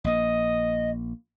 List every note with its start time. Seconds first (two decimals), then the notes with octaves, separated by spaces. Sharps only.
0.04 A#1 A#3 D#5